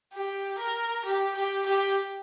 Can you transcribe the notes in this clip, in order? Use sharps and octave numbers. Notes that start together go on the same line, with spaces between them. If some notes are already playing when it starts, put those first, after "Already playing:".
G4
A#4
G4
G4
G4